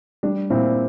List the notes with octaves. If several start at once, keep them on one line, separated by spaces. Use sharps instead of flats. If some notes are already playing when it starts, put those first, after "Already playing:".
G3 D4
A#2 C4 E4